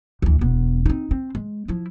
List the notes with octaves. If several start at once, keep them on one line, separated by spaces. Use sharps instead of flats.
D2 E3
E1 B3
C4 D#4
C4
G#3
F3 E4